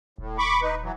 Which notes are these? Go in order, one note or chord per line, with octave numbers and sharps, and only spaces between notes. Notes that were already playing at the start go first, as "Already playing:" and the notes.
D#1 A2
B5 C#6 D6
D#4 B4
E3 F#3